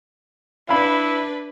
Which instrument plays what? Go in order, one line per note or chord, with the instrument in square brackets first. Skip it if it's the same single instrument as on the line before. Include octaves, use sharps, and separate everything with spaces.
[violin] D4 B4 [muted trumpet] E4 [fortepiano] F5 B5